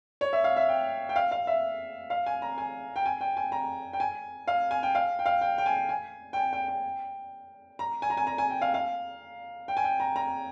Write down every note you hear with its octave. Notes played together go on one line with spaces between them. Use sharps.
C#5
E5
F5
E5
G5
G5
F5
F5
E5
F5
G#5
A#5
G#5
G5
G#5
G5
G#5
A#5
G5
G#5
F5
G#5
G5
F5
G5
F5
G5
G5
G#5
G#5
G5
G#5
G5
G5
A#5
G#5
A#5
G#5
A#5
G#5
G5
F5
F5
G5
G#5
G5
A#5
A#5